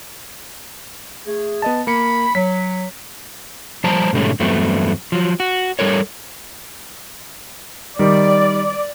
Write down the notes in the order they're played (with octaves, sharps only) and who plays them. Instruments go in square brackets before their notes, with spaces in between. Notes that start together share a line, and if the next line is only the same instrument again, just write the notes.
[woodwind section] A3 G#4
[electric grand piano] B3 D#5 A5
[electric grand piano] A#3 C#7 [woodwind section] B5
[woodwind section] F#3 [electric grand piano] B6
[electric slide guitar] F3 G3 C5 A5 A#5
G#2 B2 D3 G3 A3 C#4
E2 G2 F#3 A3 B3 C4
F3 F#3
F#4
G3 A4 A#4 C#5
[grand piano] D#3 G3 [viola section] D5